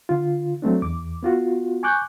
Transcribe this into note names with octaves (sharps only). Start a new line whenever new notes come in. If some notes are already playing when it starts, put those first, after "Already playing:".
D3 F4
F#3 A3 C4 D4
E2 D6
B3 F4 F#4
G#5 C#6 D6 F#6 G6